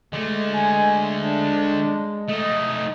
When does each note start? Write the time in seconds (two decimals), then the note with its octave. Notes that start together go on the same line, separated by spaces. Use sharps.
0.13 D3 G#3 A3
0.55 G#5
1.18 D4
2.29 A3 D#4 D#5